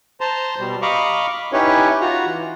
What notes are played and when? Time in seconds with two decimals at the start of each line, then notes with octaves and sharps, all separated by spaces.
0.21 C5 A5 A#5 C6
0.59 B2 G3
0.82 D#5 F5 A#5 B5 C#6 D6
1.53 C#4 D#4 E4 G4 B4 C#5
2.01 F4 F#4 A#5
2.25 E3